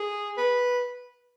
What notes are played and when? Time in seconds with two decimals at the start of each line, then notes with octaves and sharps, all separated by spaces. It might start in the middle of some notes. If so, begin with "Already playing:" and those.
Already playing: G#4
0.37 B4